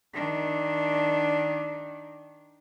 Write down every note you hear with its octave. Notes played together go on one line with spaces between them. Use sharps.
D#3 D4